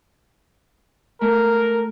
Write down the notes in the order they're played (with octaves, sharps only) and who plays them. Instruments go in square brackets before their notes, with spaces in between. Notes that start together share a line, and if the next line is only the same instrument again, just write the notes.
[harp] A3 [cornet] A#4